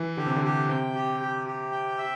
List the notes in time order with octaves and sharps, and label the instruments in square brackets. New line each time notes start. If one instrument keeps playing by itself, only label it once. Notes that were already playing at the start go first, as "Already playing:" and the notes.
Already playing: [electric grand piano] E3
[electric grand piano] D3 [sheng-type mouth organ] G4
[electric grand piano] C3
D3
[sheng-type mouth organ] G4
[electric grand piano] C3 [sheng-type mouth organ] G5
[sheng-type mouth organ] G4
G4
G4
G5
E5